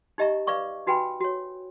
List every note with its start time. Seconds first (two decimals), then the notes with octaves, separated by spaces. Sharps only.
0.18 D#4 G4 D#5 E5 A#5 C#6
0.47 B4 D5 F5 C#6 D6
0.87 D#4 F#4 B4 G5 G#5 B5
1.21 F#4 C#5